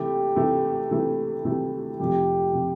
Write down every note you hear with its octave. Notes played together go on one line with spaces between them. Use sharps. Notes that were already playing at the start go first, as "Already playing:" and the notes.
Already playing: C3 E3 A3 G4
C3 E3 A3
C3 E3 A3
C3 E3 A3
F1 F2 C3 F3 G4
C3 F3